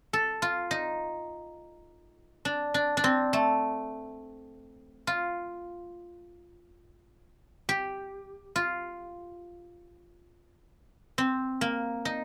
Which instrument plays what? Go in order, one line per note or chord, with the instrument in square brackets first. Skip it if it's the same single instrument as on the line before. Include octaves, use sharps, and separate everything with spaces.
[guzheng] A4
F4
D#4
D4
D4
D4
C4
A3
F4
G4
F4
C4
A#3
D#4